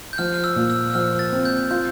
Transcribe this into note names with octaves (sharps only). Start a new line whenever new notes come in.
G6
F3 F6
F6
E6
A#2
E6
E6
F3 F6
A6
C4
G6
F4 G6